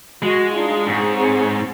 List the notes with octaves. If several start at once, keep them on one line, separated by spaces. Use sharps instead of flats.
G#3 F#4 D#5
D4 D#4 F4
G#2 C4 G#4 C#5